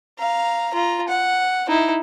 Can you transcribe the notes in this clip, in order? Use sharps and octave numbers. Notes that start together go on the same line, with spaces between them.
F5 A#5
F4 A#5
F#5
D#4 E4